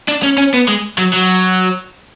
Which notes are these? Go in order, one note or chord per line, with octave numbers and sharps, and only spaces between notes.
D4
C#4
C#4
B3
G#3
F#3
F#3